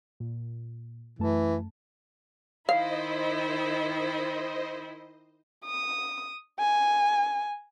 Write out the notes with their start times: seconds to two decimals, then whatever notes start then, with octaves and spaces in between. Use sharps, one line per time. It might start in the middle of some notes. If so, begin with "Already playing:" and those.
0.20 A#2
1.19 F#2 E3 A3 A5
2.69 D#3 E4 C5 D#5 F5
5.65 D#6
6.59 G#5